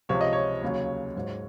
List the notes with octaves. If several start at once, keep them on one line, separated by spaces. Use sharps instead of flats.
C#2 C3 F3 C#5
D#5
C#5
D#2 C#3 F#3
G#2 F#3